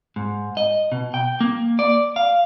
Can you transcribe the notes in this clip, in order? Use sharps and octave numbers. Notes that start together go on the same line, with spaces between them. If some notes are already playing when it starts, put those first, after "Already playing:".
G#2
D#5
B2
G5
A#3
D5
F5